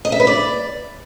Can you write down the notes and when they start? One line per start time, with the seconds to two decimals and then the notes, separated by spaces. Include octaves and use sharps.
0.05 D#5
0.12 E5
0.20 B4
0.27 D5